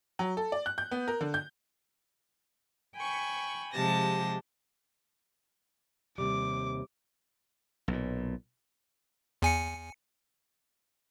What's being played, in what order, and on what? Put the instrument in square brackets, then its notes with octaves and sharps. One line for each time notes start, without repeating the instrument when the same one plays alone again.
[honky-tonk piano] F#3
A4
D5
F#6
G6
B3
A#4
D3
G6
[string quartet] G5 G#5 B5 C#6
C3 F3 G#3 G4 A5 A#6
[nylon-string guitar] D#2 C3 G3 [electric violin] D6
[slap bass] B1 A#2
[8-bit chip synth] E2 G#5 C#7